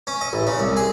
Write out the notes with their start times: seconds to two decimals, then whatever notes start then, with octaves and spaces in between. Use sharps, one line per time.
0.07 C#4
0.21 D#5
0.33 A1
0.47 C#3
0.59 C2
0.77 G#4